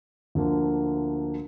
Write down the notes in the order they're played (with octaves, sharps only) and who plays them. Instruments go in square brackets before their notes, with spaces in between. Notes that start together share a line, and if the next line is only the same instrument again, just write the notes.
[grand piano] D2 D3 F3 A#3